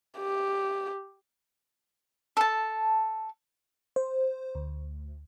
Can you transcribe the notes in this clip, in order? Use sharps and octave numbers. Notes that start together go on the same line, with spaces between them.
G4
A4 A5
C5
D2